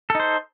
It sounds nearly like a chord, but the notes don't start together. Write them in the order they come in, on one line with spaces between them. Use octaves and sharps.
A4 D#4 C5